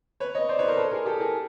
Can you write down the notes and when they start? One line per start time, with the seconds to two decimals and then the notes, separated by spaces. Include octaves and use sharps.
0.20 B4 C#5
0.35 C#5 D#5
0.49 C5 D5
0.59 B4 C#5
0.68 A#4 C5
0.77 A4 B4
0.91 G#4 A#4
1.05 G4 A4
1.19 G#4 A#4